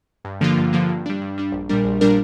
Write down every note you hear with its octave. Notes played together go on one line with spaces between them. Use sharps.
G2
D3 F3 A#3 F4
G2
D3 F3 A#3 F4
G2
G3 D4
G2
G3 D4
A#1
A#2 G3 D4 A#4
A#1
A#2 G3 D4 A#4